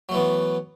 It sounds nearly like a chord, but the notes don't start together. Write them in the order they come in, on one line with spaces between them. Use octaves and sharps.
F#3 A3 E3 B3